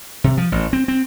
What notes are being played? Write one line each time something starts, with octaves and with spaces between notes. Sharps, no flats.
C3
F3
A1
C4
C4